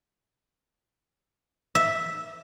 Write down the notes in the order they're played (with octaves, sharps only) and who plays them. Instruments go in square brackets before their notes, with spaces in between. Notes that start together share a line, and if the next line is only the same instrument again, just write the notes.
[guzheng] E5